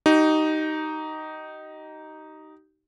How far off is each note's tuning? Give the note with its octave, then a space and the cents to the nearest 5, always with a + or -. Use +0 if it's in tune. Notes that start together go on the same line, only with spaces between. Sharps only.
D#4 +0 G4 -35